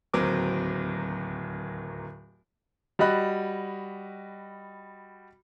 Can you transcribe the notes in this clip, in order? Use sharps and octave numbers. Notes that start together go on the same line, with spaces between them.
D1 D#2 F#3 C4 A#4 D6
G3 F#4 D#5 B5 F#6